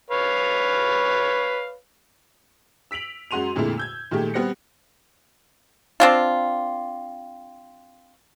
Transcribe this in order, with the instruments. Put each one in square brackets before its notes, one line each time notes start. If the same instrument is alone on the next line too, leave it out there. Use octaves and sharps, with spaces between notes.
[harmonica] B4 C#5 F5
[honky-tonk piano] E6 B6 D7 F7 F#7
F#2 G#3 F#4 C6 D#7 F7
F2 A#2 D3 G#3 A3 E4
E6 G6 G#6
A#2 D#3 G#3 A3 G4
G3 B3 C4 F#6 A#6 C#7
[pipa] C4 D4 F4